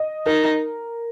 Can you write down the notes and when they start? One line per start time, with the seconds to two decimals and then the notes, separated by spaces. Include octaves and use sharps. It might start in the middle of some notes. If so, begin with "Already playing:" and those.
Already playing: D#5
0.26 D#4 A#4